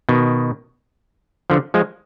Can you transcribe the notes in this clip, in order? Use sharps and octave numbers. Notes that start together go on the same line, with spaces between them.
B2 D#3
D3 F3
F3 G#3